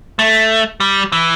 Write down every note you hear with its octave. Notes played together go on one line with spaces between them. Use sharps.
A3
G3
E3